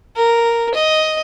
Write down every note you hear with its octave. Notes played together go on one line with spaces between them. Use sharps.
A#4
D#5